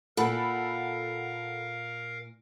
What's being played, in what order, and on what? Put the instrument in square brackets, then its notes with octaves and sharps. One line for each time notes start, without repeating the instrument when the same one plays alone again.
[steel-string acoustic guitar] A#2 [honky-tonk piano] A4 F#5 B5 [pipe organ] A#4 F5